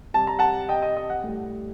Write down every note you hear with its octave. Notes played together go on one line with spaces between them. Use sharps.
C3 G3 A5
A#5
F#5 A5
D#5 G5
D#5
D#5
F#5
A2 G3